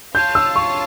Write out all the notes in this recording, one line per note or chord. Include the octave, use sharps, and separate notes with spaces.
F4 C#5 F5 A5 G6
E6
C#6